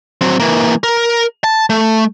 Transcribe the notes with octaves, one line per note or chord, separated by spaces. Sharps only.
F#3 C4
E3 A#3
A#4
A5
A3